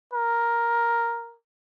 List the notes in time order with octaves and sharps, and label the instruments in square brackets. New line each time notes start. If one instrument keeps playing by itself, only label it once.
[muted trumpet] A#4